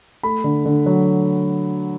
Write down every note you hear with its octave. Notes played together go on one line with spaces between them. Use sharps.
A3 B5
D3
D3
F#3